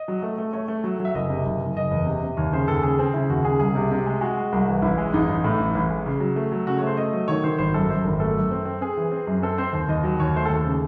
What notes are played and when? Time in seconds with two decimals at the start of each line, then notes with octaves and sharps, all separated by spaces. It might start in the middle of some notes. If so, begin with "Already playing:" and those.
Already playing: D#5
0.08 F#3
0.22 A3
0.38 A3
0.53 A3 C#5
0.68 A3
0.84 F#3
1.00 F#3
1.05 E5
1.15 F#1 D#5
1.30 C3
1.46 F#1
1.61 F#1
1.76 F#1 D#5
1.91 E2
2.06 C3
2.23 C3
2.37 D#2 C#5
2.53 C#3 C5
2.68 D#2 A4
2.83 C#3 G#4
2.99 C4 G#4
3.14 C#3 E4
3.29 D#2 F#4
3.45 C#3 G#4
3.59 C2 G#4
3.75 C3
3.91 C3
4.06 G#3
4.21 G#3 F#4
4.37 G#3
4.52 C2
4.68 E3
4.82 A1 E4
4.98 G#3
5.13 A1 D#4
5.29 A1
5.44 A2
5.60 A1
5.75 A1
5.90 G#3
6.06 C#3
6.20 F#3
6.36 A3
6.52 F#3
6.66 C#3 F#4
6.77 C#5
6.82 A3 C5
6.97 A3 D#5
7.13 F#3
7.28 D#3 C#5
7.43 D#3 C5
7.58 G#1 C5
7.74 F#2 A4
7.90 F#2 C5
8.05 G#1
8.20 A3 A4
8.36 F#2
8.51 C4
8.65 C4
8.81 C4 G#4
8.97 E3
9.12 C4
9.27 F#2
9.42 C4 A4
9.58 C4 C5
9.73 D#2 C5
9.89 D#2 D#5
10.03 F#3 D#5
10.20 D#2 C#5
10.35 A3 C5
10.45 D#2 A4
10.65 C#3